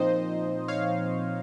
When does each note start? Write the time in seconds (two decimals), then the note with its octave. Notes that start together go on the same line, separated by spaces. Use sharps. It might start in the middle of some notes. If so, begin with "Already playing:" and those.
Already playing: A#2 F3 C4 D#4 C5 D#5
0.68 C#5 F5